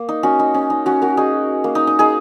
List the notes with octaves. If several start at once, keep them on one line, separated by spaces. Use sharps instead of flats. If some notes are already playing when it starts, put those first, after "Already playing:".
Already playing: A#3
D#4
C#4 F#4
D#4
C#4
D#4
C#4 F#4
F#4 A#4
D#4 G#4
A#3
D#4
D#4
D#4 G#4